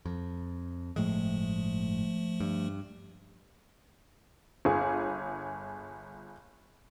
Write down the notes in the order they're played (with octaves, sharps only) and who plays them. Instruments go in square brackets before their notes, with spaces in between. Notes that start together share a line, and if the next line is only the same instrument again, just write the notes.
[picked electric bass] F2
[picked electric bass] G1 A2 G#3 [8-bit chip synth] F3 A3
[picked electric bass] G2
[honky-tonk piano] G1 G#4